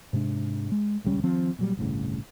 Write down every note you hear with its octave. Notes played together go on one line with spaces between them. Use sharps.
G#2 C3 G#3 D4
G#3
D#1 C#2 G3 C#4
D#3 F3 C4
A#2 F#3 G3
G1 C2 A2 C#3